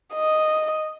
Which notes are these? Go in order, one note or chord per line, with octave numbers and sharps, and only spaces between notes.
D#5